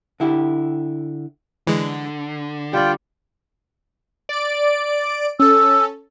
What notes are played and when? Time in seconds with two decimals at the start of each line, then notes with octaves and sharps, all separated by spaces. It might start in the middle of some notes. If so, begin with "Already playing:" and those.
0.20 D3 E4 G4
1.67 D3 E3 G#3
2.73 G3 F4 D5 G5
4.29 D5 D7
5.39 C#4 A4 E6